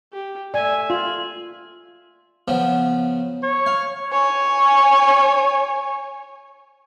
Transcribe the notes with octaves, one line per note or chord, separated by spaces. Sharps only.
G4
A3 D5 E5 G#5
F4 F#7
C#3 F3 B3
C#5
F5
C#5 G#5